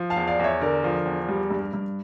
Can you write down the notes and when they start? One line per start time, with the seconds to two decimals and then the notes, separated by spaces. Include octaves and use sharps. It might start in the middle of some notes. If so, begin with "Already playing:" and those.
Already playing: F3
0.10 F5 A5
0.16 E2
0.27 D5 F5
0.39 E2 C#5 E5
0.61 D3 A#4 D5
0.84 F3
1.06 E2
1.29 G3
1.50 G2
1.73 G2